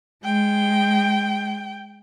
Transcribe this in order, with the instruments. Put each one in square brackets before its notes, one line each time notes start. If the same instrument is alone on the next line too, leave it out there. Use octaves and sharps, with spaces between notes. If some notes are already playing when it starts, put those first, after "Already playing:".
[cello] G#3 [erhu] G5